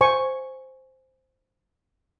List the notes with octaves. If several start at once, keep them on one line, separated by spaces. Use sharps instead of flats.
C5 G#5 C#6